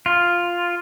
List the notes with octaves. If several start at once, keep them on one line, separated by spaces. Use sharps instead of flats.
F4